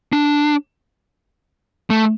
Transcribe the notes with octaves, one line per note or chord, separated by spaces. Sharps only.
D4
A3